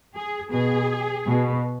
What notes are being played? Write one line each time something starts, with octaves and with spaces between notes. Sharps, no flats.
G#4
B2 G#4
B2